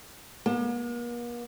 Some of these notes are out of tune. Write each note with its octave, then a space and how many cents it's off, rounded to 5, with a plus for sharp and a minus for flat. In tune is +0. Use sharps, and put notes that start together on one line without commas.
A#3 +45